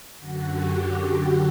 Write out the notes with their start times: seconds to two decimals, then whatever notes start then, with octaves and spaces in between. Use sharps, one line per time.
0.20 F#2 D3 F#4
0.49 G4